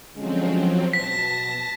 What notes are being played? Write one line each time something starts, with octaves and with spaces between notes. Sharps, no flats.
D3 F3 F#3 G#3 C4 C#4
B2 A5 A#6 B6